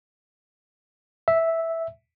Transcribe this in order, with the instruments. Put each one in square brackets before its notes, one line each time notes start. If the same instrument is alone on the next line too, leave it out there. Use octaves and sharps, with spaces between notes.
[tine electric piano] E5